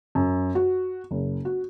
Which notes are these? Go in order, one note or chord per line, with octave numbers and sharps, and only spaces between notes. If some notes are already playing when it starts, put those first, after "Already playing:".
F#2
F#4
F#1
F#4